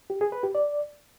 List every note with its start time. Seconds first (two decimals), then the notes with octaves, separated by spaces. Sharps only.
0.10 G4
0.21 G#4
0.32 B4
0.43 G4
0.55 D5